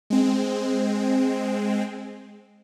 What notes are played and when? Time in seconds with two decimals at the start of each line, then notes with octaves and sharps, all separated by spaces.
0.10 G#3 C4